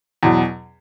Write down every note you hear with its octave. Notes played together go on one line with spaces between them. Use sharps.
E2 B2 F#3